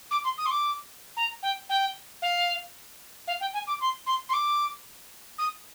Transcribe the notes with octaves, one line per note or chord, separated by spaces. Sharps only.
D6
C6
D#6
C6
D6
A#5
G5
G5
F5
F5
G5
G#5
D6
C6
C6
C6
D6
D#6